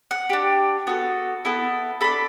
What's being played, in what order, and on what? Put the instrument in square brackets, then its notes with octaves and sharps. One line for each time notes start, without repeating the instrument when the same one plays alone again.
[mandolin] F#5
D4 G4
B3 F#4 A4
B3 E4 A4
D4 A4 B5